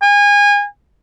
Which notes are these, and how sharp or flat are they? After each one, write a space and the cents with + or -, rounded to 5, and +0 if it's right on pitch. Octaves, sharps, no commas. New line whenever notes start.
G#5 -25